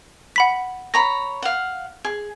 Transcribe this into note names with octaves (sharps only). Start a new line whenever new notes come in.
F#5 B5 B6
C#5 A#5 B5 A#6
F5 F#5
G#4